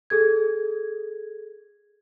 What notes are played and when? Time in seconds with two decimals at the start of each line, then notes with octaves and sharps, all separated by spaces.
0.10 G#4 A4 G#6